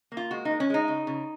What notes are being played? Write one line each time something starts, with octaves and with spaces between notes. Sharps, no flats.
A#3
F4
G#3 F#4
D#4
G#3
C#4
G#3 D#4
C#3
C#3